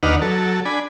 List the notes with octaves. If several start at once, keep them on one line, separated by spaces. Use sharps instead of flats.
D#2 D4 D#4 B4 F#5 F6
F#3 A4
D4 G#5 B5